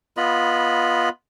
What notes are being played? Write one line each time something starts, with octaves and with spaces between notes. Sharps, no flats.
B3 F4 D#5 B5